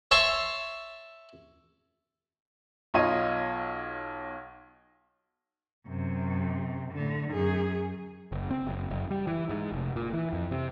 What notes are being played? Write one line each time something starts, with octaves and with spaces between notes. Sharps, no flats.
C#5 E5 A5 C6 C#6
B1 F4 C#5 D#5 D#7
F#2 C3
A2 D3
F#2 G#4
F#1
C4
F#1
F#1
G3
E3
G#2
F1
A#2
E3
F2
C3